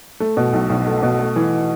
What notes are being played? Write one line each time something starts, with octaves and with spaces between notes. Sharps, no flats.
A3
B2
B1
B1
A3
B2
A3
E3